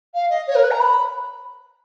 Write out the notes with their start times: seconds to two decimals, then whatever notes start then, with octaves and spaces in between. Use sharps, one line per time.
0.14 F5
0.29 D#5
0.47 C#5
0.55 A#4
0.63 B4
0.70 A#5
0.79 B5